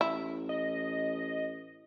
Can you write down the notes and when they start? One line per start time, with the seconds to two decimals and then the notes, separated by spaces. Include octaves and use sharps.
0.01 A1 E4
0.49 D#5